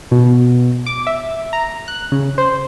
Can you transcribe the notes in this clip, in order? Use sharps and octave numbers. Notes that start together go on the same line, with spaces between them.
B2
D6
E5
A#5
F#6
C#3
C5